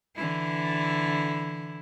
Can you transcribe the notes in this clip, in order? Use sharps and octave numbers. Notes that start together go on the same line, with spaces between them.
D3 E3 E4